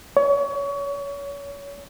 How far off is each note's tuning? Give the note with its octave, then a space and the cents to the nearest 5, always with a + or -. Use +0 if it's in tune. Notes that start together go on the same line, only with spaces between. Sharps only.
C#5 +30